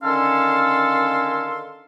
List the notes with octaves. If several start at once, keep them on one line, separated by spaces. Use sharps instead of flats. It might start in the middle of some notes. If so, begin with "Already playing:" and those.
D3 D#3 C#4 A4 F5 C6